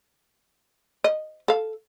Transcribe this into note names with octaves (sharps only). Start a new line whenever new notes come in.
D#5
A4 F5